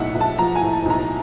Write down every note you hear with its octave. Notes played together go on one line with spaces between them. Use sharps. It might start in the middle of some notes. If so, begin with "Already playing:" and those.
Already playing: B1 A2 E5 F#5
B1
A5
F3 A#5
G#5
A2
A5
B1 A#5